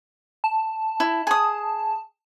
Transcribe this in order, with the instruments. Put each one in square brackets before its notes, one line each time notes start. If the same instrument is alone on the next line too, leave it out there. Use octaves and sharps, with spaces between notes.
[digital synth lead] A5
[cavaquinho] E4
G#4 D#6